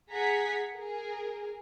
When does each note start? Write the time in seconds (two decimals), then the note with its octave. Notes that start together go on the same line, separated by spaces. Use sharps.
0.10 G#4 F#5 A#5 G#6 B6
0.74 G#4 A#4